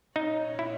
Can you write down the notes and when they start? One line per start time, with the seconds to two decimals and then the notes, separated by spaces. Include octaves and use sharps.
0.16 A#2 A#3 C#4 D#4 F#4 C#5
0.59 E4